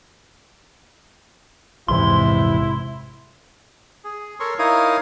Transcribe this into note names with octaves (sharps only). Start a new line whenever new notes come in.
A#1 E2 G#2 C3 E3 E4 C6
G#4
A4 A#4 C#5 C6 C#6
D#4 E4 A#4 C#5 F5 D#6